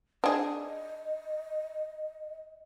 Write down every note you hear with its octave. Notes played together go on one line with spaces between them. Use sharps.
D4 G#4 D#5